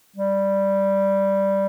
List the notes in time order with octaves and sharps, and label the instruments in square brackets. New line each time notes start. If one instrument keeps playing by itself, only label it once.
[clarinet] G3